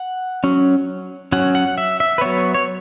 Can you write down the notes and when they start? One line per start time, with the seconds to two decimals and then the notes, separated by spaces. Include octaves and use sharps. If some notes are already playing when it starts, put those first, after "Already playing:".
Already playing: F#5
0.44 F#3 C#4
1.32 F#3 C#4 F#5
1.55 F#5
1.78 E5
2.00 E5
2.18 B4
2.21 F#3 B3 C#5
2.54 C#5